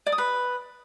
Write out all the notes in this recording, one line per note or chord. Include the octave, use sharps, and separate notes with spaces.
D5
D#6
B4